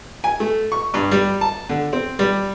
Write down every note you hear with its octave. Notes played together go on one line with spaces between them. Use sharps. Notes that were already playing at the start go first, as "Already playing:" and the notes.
G#5
A3
C#6
G2
G3
A5
D3
C4
G3